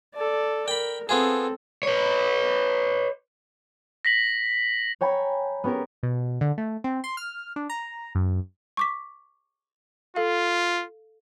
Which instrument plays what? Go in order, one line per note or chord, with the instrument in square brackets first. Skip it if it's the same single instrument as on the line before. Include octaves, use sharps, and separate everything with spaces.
[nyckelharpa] A4 D5
[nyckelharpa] A#4 [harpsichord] G5 B5
[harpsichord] B3 F4 G#4 [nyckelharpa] C4 A4
[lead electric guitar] B4 C#5
[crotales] A#6 B6 F#7
[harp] C#5 G5 G#5 A#5 B5
B3 C#4 G4 G#4 A#4
[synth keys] B2
D3
A3
C4
C6
F6
D4
A#5
F#2
[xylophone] C#6 D6 B6
[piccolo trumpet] F4 [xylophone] A4 F5